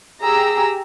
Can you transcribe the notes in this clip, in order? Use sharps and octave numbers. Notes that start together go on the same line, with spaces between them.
G4 G#4 A#5 E6